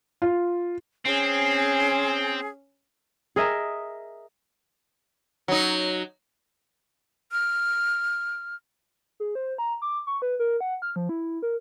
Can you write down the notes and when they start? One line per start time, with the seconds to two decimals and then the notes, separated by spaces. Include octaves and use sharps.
0.22 F4
1.06 C4 C#4 G#4
3.36 G#4 A#4 D#5 E5
5.48 F#3 D#4
7.32 F6
9.20 G#4
9.35 C5
9.58 A#5
9.82 D6
10.07 C#6
10.22 B4
10.39 A#4
10.61 F#5
10.82 F6
10.96 F3
11.09 E4
11.43 A#4